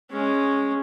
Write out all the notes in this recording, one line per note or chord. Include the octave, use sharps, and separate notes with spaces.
G#3 C#4